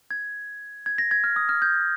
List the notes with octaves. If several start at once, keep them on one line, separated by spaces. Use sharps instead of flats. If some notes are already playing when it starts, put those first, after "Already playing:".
G#6
G#6
A#6
G#6
F6
D#6
F6
G6